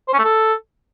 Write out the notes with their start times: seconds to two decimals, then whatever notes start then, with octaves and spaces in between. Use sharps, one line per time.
0.08 C5
0.13 C#4
0.19 A3
0.24 A4